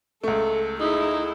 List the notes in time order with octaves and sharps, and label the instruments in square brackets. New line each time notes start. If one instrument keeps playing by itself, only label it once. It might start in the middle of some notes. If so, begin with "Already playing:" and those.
[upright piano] C#2 A3 [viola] A4
[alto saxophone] D#4 [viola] E4 G#4